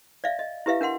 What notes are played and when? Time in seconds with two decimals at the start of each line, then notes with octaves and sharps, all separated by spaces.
0.24 D5 E5 F5
0.39 D#5
0.66 E4 G4 B4 E5 F5
0.81 D4 A#4 F#5 C6